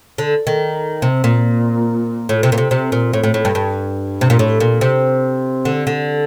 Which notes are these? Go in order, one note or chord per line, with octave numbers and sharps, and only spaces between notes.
D3
D#3
C3
A#2
A2
C3
A#2
C3
C3
A#2
A2
A2
A2
G2
G2
C3
A#2
A2
A#2
C3
D3
D3